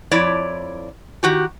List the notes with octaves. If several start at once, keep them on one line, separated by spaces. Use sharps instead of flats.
F2 E4 C#5 D5
D#3 F#4 G4